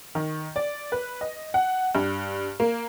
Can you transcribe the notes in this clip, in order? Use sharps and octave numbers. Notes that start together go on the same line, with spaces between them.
D#3
D5
B4
D#5
F#5
G2
A#3